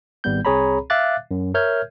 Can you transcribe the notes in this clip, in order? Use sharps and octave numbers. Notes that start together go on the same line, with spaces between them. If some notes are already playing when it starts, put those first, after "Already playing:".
G#1 G3 B3 G6
C2 C4 G#4 C#5 A#5 B5
E5 F5 D6 F#6 A6
F#2
A#4 C#5 E5 F6 G6 G#6